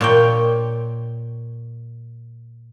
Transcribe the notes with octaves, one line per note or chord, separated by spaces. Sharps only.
A#2 C#5 G5